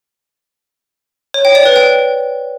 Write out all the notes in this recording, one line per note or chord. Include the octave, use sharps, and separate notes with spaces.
C#5
G5
D5
B4
G5